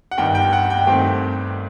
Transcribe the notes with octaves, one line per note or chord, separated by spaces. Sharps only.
F#5
G1 G2 D#3 G5
G5
F#5
G5
G2 D#3 A3 C4 G5